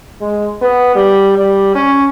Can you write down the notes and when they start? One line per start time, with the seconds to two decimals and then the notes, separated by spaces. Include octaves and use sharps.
0.21 G#3
0.61 B3
0.95 G3
1.37 G3
1.75 C#4